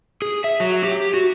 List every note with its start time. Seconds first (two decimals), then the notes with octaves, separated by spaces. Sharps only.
0.22 G#4
0.44 E5
0.60 F#3
0.84 G4
1.14 F#4